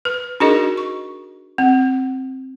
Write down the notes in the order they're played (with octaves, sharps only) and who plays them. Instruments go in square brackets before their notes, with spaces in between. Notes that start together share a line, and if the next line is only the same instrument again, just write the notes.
[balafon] B4
D4 D#4 F#4 G#4 A#4 D#5
C#6
C4